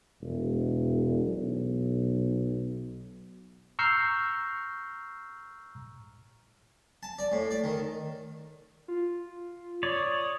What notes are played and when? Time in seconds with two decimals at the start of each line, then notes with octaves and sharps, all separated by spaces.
0.21 E1
1.24 B1
3.79 A#5 C#6 E6 F6 G6 C7
7.03 A5
7.19 D5
7.32 A2
7.51 D5
7.64 D#3
8.88 F4
9.83 C#5 D5 D#6